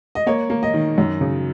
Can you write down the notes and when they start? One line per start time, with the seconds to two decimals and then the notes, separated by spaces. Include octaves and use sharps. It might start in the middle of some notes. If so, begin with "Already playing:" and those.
0.15 D#5
0.26 A#3 C#5
0.50 A#3
0.63 D#5
0.74 D#3
0.98 F#2
1.21 C#3